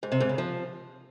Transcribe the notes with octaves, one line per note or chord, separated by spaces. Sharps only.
G#2
C3
G#2
C#3
F3